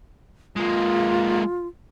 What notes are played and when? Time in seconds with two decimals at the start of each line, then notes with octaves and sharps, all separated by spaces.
0.56 G#3 A#3 F4